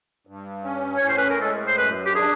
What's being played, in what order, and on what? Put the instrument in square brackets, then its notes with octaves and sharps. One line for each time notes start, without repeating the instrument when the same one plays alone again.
[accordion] G2
C#4
[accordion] A2 [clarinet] C#5
[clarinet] C5
B4
A#4
[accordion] G#3 [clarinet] A4
[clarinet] C5
[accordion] F#2 [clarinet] B4
[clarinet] G4
[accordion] D4 [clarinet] G#4